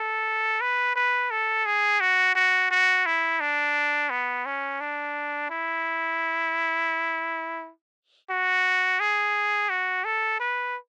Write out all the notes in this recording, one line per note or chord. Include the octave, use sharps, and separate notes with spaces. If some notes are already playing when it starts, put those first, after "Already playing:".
Already playing: A4
B4
B4
A4
G#4
F#4
F#4
F#4
E4
D4
B3
C#4
D4
E4
F#4
G#4
F#4
A4
B4